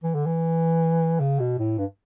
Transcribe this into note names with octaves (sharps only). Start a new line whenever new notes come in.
E3
D3
E3
C#3
B2
A2
G2